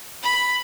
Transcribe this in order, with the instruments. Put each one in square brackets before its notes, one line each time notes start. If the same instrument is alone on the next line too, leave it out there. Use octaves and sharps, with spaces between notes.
[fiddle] B5